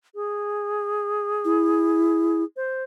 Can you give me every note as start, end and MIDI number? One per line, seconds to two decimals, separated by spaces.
0.15 2.44 68
1.45 2.43 64
2.57 2.83 72